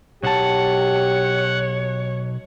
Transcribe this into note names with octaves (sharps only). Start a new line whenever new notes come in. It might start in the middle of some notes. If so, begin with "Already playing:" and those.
B1 G4 C#5 F#5 A5